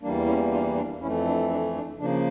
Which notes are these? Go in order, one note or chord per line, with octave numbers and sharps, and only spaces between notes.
E2 E3 G3 A#3 D4
C#4 E4
D4 F4
D4
F2 E3 A3 C#4 E4
D4
D4
D4
C#3 F3 A#3 D4